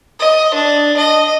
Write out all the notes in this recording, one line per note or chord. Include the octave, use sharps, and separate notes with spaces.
D#5
D4
D#5